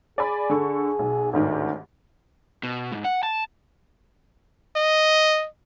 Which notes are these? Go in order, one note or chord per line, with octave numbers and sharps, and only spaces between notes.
G#4 D5 G#5 B5
D3 A4 C#6
B1 B2
A1 D2 G#2 D#3
B2
G#2
F#5
A5
D#5